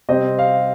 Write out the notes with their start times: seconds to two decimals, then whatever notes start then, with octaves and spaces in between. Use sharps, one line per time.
0.09 C3 G3 C4 D#5
0.39 F5